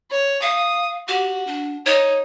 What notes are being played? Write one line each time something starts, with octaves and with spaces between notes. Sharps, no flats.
C#5
F5 D#6
F#4 G4
D4
D#4 C#5